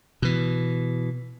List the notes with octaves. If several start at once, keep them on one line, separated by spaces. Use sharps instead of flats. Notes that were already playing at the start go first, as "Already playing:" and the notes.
B2 E3